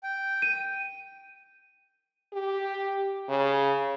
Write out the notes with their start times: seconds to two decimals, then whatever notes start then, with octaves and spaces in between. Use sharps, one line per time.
0.03 G5
0.42 D#7
2.33 G4
3.29 C#3